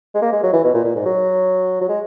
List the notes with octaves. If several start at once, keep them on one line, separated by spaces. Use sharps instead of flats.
G#3
A#3
G#3
F#3
E3
B2
A#2
A#2
G#2
F#3
F#3
G#3